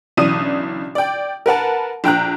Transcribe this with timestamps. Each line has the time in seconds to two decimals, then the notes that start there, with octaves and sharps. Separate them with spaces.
0.17 B1 C#3 E3 D4 D#6 D#7
0.95 D5 G5
1.46 A#4 B4 F#5 A5
2.04 A#1 G5 A#5 F#6